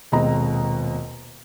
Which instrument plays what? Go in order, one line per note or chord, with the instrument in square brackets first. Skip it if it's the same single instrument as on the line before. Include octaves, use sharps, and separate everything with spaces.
[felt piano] D#1 B2 G#3 C4 D#5 A#5